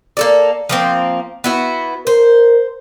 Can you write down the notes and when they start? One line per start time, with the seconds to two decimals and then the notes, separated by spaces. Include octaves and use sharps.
0.17 A#3 A4 D5
0.69 F3 A#3 C4
1.44 B3 E4 F#4
2.07 A#4 C5